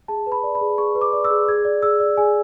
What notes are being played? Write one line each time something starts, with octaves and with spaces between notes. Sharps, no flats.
G#4 A5
B4
B5
D5
B5
G#4
G#4 C#6
B4
D6
D5
E6
G#4
G#4 G#6
D5
G#4 E6
D5
G#4 G#5